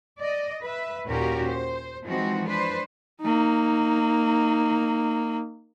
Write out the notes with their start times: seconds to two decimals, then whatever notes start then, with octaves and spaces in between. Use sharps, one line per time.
0.20 D5 D#5
0.64 B4 E5
1.06 D#2 A#2 C#4 F#4 G4 A#4
1.46 C5
2.03 E3 F3 G#3 C4 D#4 F#4
2.47 D4 B4 C5
3.21 A#3 D#4